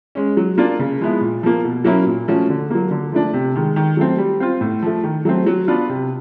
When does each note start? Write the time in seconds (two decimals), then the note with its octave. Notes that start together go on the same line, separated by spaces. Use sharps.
0.15 G#3 C#4
0.37 F#3
0.58 A#3 D4 F4
0.79 C#3
1.01 F3 G#3 B3 E4
1.21 A#2
1.43 F3 A#3
1.64 B2
1.84 F#3 A#3 C#4 E4
2.07 A#2
2.28 F3 A3 C#4 F#4
2.49 D3
2.70 F#3 A#3
2.91 D3
3.12 F3 A3 D4
3.33 C3
3.56 D#3 G#3
3.76 D#3
3.97 F#3 A3 C4
4.18 G3
4.40 C4 F4
4.61 A2
4.82 F3 A3
5.03 D#3
5.25 F#3 A3 C4
5.46 F#3
5.68 B3 D4 F4
5.89 C3